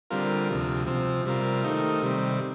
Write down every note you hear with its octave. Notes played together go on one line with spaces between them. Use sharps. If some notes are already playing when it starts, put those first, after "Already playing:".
D3 G3 C4 F4 A#4
D2 C3 F3
C3 F3 C4
C3 G3 C4 F4 A#4
D#3 A3 C4 D#4 A#4
C3 D#3 G3 C4